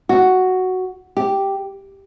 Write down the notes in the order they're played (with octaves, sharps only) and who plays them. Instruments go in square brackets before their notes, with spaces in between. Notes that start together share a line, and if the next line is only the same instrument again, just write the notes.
[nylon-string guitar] F#4
G4